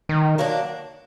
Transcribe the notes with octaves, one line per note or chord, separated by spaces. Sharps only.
D#3
F#3 A#3 D4